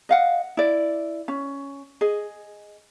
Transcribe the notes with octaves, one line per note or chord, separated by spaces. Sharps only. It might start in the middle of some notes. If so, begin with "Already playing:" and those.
D#5 F5 F#5
E4 D5
C#4
G#4 D#5